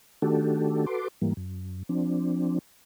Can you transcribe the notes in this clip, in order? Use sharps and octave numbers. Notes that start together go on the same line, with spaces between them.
D#3 A3 D4 F#4 G4 A4
F#4 A4 B4 C6 D6
G#2 E3 G3 A#3
F#2
F3 C4 D4